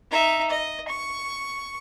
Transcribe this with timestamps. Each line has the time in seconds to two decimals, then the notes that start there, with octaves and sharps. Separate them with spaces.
0.11 D#4 E5
0.50 D#5
0.88 C#6